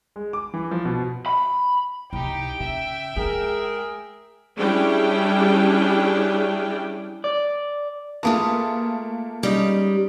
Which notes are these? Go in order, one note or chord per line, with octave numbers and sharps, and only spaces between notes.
G#3
D6
E3
F3
B2
B5
C2 D#4 G4 G5
C#3 E5
G#3 G#4 A#4
G3 C#4 D4 E4 G#4 G5
D5
A3 A#3 F4 G#4 B4 A5
G3 G#3 C#4 D#4